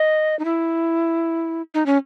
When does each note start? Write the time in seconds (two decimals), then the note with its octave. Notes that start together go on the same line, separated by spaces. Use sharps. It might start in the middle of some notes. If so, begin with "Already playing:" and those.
Already playing: D#5
0.39 D#4
0.45 E4
1.74 D#4
1.86 C#4